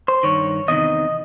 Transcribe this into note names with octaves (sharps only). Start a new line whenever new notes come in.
C5
G2 D#3 C#5
E2 C3 D#3 D#5